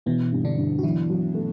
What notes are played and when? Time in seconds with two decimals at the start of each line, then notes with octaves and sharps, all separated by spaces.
0.06 B2 E3 B3
0.32 G2
0.45 D3 D4
0.57 G2
0.79 F#4
0.83 E3 F#3 E4
1.09 F#3
1.35 A3